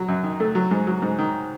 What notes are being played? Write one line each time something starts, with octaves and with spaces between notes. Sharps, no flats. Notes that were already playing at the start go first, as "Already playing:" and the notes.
Already playing: F#3
F#2
D#3
A3
F#3
G#2
F#3
G#2
D#3